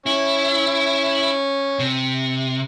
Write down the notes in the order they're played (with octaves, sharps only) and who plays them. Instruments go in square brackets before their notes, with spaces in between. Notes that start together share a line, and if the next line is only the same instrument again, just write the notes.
[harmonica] C#4 [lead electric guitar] E4
[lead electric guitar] C3